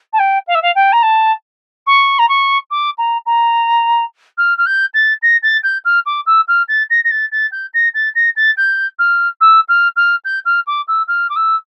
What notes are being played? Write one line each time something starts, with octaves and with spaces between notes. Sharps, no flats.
A5
G5
F5
E5
F5
G5
A#5
A5
C#6
A#5
C#6
D6
A#5
A#5
F6
F6
G6
A6
A#6
A6
G6
F6
D6
E6
F6
A6
A#6
A#6
A6
A6
G6
A#6
A6
A#6
A6
G6
F6
E6
F6
F6
G6
F6
D6
E6
F6
D6
E6